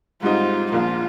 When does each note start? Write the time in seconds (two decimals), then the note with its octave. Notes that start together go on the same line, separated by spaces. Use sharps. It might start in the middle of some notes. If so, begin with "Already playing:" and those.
0.22 G#2 G3 C4 D#4 F4
0.72 A#1 A#2 F3 A#3 F4